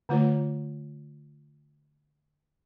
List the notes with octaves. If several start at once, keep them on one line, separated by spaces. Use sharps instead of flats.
D3 A3 F4 C#5